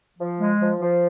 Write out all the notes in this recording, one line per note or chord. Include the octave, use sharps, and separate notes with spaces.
F3
G#3
F3
F3